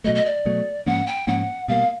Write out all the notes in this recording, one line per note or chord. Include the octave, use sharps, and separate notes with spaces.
B2 F#3 A3 D#5
D#5
D5
B2 F#3 A3
G#2 F3 A#3 C#4 F#5
G5
G#2 F3 A#3 C#4 F#5
B2 G3 A#3 F5